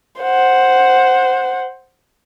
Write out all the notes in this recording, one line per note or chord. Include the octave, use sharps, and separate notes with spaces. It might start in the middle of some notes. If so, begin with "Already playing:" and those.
C5 F#5